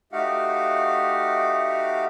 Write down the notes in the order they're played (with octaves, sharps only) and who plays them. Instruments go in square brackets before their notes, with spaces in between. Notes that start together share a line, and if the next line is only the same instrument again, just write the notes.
[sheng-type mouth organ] A3 D#4 F#4 G4 F5 F#5